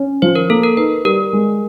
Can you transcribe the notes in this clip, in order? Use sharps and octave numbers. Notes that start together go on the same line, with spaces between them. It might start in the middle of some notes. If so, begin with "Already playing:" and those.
Already playing: C#4
F3 C5
A#4
A#3 A4
A#4
D#4 B4
G3 A#4
G#3